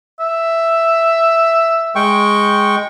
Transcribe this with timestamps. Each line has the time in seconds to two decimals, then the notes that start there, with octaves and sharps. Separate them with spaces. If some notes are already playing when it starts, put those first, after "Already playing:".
0.20 E5
1.95 G#3 G5 C#6